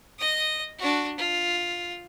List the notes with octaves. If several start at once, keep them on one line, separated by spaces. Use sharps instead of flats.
D#5 D#6
D4 F#4
F4